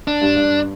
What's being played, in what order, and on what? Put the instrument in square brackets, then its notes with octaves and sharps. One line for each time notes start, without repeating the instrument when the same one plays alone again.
[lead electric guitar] D4
[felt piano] G2
G2